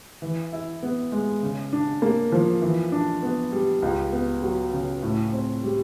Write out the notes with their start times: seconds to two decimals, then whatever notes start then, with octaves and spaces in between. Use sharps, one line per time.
0.22 E3
0.53 E4
0.83 B3
1.12 G#3
1.43 C#3
1.73 D4
2.02 A#3
2.32 F3
2.62 E3
2.92 D4
3.23 B3
3.52 G3
3.82 C#2
4.12 B3
4.43 F#3
4.73 C#3
5.03 A2
5.33 C4
5.63 G3